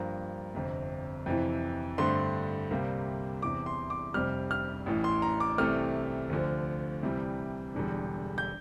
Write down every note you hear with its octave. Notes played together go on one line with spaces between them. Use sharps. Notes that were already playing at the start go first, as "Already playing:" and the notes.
Already playing: G2 F3 A#3 A#5
G1 F2 C3
F2 C3 E3
G2 D3 A3 C4 C6
C2 C3 G3 A#3
E2 C3 E3 D6
C6
D6
F1 F2 C3 G3 F6
F6
A1 A2 E3
C6
A#5
D6
C2 C3 E3 A3 F6
D2 D3 F3
C2 C3 E3 G3
E1 E2 D3 G3
G6